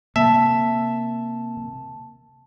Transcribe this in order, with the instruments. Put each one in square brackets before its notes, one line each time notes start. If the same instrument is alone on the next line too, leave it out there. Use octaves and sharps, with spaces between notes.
[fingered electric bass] C3 A#3 [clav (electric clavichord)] E5 [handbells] A5